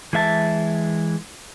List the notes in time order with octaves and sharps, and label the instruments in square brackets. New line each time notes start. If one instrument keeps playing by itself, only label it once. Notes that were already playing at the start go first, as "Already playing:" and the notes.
[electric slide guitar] E3 G#3 E5 A5